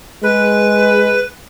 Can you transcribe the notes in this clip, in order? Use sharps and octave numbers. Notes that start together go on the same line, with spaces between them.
G#3 B4